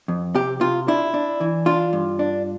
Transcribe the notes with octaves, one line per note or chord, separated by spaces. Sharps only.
F2
C3 G4
C3 F4
D4 E4
D4
E3
D4 F4
G2
D4